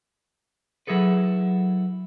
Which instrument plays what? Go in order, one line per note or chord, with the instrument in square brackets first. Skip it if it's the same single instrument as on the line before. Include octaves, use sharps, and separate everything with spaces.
[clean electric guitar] F#3 E4 G#4 A4 B4